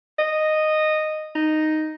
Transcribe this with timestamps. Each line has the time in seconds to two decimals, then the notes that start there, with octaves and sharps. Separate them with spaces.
0.19 D#5
1.35 D#4